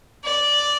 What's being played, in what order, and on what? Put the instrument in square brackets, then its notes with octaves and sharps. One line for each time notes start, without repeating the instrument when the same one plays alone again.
[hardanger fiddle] D5